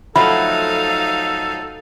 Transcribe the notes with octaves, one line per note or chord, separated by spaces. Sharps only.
F3 F#3 A3 D#4 A4 F5 B5